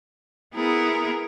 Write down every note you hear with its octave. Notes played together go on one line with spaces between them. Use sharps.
B3 E4 G#4 A#4